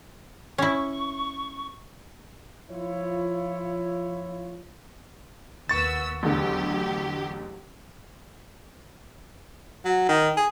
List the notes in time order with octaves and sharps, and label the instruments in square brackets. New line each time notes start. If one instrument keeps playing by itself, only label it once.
[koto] C#4 E4 [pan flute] C#6
[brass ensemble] F3 E4 F4 C#5
[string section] D#2 B3 E6 [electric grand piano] C#6 A6
[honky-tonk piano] A1 E2 D3 [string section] F#3 G4
[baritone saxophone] F#3
D#3
G#4